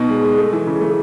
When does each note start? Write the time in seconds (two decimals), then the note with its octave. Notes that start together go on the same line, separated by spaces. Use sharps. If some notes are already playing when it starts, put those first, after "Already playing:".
Already playing: B2 D#4
0.09 G#3
0.23 G#3
0.38 A3
0.53 E3
0.67 C#3
0.81 A3